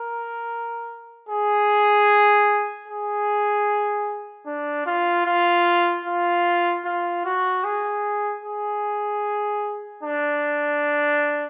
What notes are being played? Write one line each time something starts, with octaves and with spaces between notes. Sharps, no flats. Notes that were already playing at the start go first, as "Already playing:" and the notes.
Already playing: A#4
G#4
G#4
D4
F4
F4
F4
F4
F#4
G#4
G#4
D4